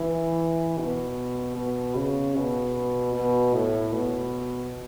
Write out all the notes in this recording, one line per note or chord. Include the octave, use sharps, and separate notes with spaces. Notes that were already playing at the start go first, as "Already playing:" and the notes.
Already playing: E3
B2
B2
C#3
B2
B2
A2
B2